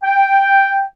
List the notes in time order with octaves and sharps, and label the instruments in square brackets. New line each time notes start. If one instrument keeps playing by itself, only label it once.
[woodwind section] G5